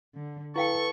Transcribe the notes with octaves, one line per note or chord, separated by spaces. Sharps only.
D3
E4 A4 B4 F5 G5 C#6